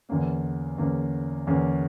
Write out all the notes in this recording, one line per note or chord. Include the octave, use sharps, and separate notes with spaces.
E2 D3 A#3 C#4
E2 D3 A#3 C#4
E2 D3 A#3 C#4